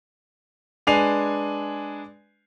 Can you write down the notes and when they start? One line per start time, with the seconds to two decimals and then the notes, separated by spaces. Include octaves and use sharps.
0.87 G#3 D4 B4 G#5 C7 F7